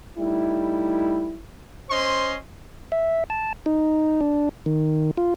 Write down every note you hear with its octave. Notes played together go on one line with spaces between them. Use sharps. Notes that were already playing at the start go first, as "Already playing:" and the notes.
G3 A3 D#4 E4
C#4 C5 D#5 C6
E5
A5
D#4
D4
D#3
F4